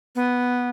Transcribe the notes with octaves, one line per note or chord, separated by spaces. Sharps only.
B3